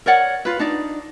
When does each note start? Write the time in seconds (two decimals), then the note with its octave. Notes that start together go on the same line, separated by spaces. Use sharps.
0.06 A#4 C#5 D5 F#5
0.45 F4 B4
0.59 D4 D#4 D5